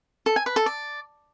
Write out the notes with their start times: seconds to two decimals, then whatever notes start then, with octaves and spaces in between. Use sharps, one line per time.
0.26 A4
0.36 G#5
0.46 B4
0.56 A4
0.66 D5